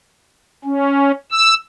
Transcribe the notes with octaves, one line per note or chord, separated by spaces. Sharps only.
C#4
E6